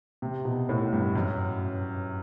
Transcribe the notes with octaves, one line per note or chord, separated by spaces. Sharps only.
C3
B2
A2
G2
F#2